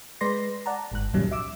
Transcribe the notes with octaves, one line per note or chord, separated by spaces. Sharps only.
G#3 B4 D5 C6 A#6
D5 F#5 A5 A#5
G1 G#2 F#6
C#2 A#2 D#3 F#3 G3 C#4
E5 D6 E6